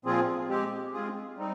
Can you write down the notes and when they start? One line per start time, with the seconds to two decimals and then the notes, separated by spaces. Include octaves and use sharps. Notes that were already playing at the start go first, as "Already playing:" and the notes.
0.05 A#2 F3 C4 F4 G#4
0.49 G#3 C4 G4
0.93 G#3 C4 F4 G#4
1.37 G3 C4 D#4